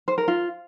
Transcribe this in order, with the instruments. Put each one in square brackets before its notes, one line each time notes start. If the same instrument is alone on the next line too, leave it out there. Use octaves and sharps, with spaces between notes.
[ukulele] C5
A#4
F4